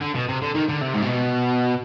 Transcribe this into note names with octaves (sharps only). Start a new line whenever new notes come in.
D3
B2
C3
D3
D#3
D3
C3
G#2
B2